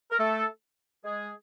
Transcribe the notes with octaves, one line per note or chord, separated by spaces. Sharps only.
A#4
A3 A4
G#3 G#4